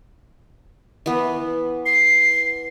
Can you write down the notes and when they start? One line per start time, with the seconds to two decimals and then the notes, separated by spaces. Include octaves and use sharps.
1.06 E3 B3
1.86 C7